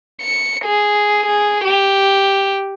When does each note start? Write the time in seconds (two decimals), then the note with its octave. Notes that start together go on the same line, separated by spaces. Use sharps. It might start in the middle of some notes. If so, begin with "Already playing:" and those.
0.22 C#7
0.65 G#4
1.26 G#4
1.64 G4